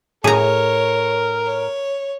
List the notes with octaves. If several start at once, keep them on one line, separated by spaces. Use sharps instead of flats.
A2 G#4 A#4 C#5 A#5
C#5